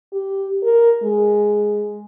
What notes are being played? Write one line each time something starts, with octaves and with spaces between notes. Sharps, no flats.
G4
A#4
G#3